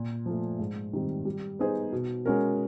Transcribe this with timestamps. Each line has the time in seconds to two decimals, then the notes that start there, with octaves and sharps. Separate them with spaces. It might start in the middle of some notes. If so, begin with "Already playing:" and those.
Already playing: A#2
0.26 F3 A3
0.59 G#2
0.93 D#3 G3 C4
1.25 G3
1.59 B3 D#4 G#4 C5
1.92 B2
2.26 G#3 C#4 F#4 A#4